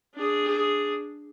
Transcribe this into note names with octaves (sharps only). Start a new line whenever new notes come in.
D4 G#4